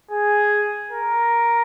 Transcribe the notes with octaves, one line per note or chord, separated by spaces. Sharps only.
G#4
A#4